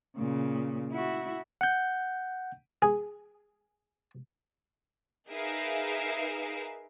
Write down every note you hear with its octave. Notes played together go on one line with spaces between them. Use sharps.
A#2 C#3
E4 F#4
F#5 G6
G#4
D#4 G#4 A#4 B4 E5 F5